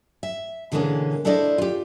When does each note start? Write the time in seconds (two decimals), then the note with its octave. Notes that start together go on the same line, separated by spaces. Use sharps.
0.23 E5
0.72 B2 D3 E3 G#3 A#3 C#4
1.25 D4 E4 A4 C5 D5 D#5
1.58 F4 G4